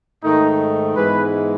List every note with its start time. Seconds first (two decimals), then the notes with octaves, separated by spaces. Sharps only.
0.23 G#2 D#3 A3 D#4
0.95 G#2 E3 G#3 B3 B4